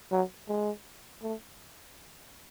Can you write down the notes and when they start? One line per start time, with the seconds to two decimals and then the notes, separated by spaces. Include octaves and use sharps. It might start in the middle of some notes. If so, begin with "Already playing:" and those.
0.11 F#3
0.49 G#3
1.23 A3